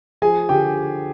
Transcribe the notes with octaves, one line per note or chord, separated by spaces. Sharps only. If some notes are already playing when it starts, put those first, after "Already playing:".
F3 G#4 G#5
D3 G4 G5